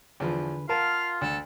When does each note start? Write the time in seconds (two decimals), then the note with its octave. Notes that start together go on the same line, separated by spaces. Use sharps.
0.20 E2 D3 F3 B4
0.69 F4 A#4 F5 F#5 A5
1.21 D2 A4